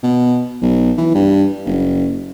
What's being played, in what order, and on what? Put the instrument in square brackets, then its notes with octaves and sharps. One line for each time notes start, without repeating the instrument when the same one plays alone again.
[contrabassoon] B2
B1
E3
G2
F#1